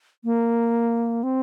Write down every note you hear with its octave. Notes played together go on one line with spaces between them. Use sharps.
A#3
C4